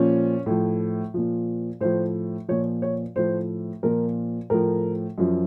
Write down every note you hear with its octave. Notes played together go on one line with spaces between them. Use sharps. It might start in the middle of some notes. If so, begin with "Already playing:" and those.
Already playing: A#2 F3 C#4
A2 F3
A#2 F3
A2 F3 C5
A#2 F3 C#5
C#5
A2 F3 C5
A#2 F3 A#4
A2 F3 A#4
F#2 F3